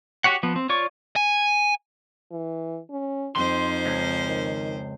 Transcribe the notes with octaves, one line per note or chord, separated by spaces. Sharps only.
F#4 G4 C#5 F#5
F3 B3
C4
F4 C#5 D5 C#6
G#5
E3
C#4
F2 D#4 C5 C6
C#2
D#3